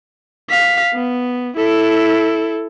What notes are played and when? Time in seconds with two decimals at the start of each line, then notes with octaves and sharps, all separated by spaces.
0.50 F5 B6
0.94 B3
1.57 E4 A4